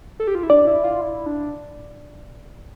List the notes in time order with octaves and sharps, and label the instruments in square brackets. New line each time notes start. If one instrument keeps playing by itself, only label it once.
[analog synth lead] A4
G4
F4
E4
[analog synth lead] D4 [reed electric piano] D5
[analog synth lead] E4
F4
E4
D4